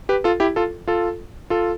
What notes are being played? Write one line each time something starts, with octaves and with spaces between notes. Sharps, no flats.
G4 B4
F4 A4
E4 G4
F4 A4
F4 A4
F4 A4